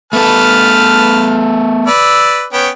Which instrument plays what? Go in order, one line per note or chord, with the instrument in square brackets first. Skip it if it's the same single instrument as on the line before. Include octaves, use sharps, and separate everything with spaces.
[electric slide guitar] A3 B3 A4 [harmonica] B4 A5 F6
[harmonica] B4 D5 E6
B3 C#4 G5